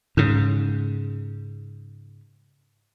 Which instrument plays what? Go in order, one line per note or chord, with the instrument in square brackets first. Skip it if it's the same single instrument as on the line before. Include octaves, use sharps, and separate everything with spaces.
[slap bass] G#2 C#3